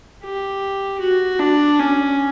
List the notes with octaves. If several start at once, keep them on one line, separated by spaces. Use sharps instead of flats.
G4
F#4
D4
C#4